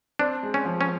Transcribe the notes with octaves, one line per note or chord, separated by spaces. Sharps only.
C4 D4
G#3
C#4
F3
C#4